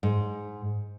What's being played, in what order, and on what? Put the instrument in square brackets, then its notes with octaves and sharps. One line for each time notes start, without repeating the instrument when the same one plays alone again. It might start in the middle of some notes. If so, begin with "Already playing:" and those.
[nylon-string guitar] G#2